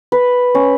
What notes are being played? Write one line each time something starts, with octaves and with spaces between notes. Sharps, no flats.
B4
C#4